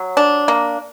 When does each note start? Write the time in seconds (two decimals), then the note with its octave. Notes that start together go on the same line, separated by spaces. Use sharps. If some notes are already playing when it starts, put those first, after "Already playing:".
Already playing: F#3
0.17 D4
0.48 A#3